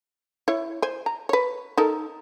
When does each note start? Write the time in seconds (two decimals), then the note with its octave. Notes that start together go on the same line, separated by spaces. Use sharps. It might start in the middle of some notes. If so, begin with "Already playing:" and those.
0.48 E4 C#5
0.82 C5 G#5
1.06 A#5
1.29 B4 C#5
1.77 D#4 A4 A#4